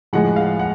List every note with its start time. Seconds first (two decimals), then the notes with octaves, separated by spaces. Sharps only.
0.13 A2 F3 G#3 F#5
0.36 F5
0.59 F#5